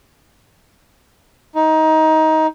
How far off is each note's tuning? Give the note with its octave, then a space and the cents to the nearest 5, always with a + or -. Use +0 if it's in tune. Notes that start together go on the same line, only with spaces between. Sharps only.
D#4 +20